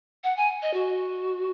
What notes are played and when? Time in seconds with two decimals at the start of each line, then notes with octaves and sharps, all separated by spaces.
0.24 F#5
0.37 G#5
0.62 D#5
0.74 F#4